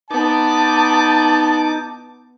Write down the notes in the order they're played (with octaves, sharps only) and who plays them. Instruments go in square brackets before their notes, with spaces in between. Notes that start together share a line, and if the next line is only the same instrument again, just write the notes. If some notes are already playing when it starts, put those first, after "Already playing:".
[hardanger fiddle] B3 [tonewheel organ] D#4 D6 [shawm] A5